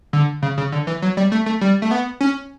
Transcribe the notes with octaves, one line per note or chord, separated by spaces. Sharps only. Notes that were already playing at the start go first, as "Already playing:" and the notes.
D3
C#3
C#3
D3
E3
F#3
G3
A3
A3
G3
A3
B3
C#4